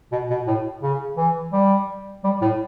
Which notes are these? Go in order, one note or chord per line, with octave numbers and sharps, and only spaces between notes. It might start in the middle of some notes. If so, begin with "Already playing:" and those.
B2
B2
A2
C#3
E3
G3
G3
A2